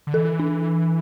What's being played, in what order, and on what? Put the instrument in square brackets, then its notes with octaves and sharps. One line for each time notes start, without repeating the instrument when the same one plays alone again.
[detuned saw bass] D3
[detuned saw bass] E3 [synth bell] A4
[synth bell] D4